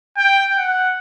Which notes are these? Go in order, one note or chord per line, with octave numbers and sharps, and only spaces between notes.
G5
F#5